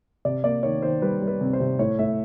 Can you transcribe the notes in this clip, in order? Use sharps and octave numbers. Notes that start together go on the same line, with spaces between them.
C3 D5
A#3 D5
D#3 C#5
D#3 C5
G3 B4
G3
B4
C3
C5
C3
A2 C#5
A2 E5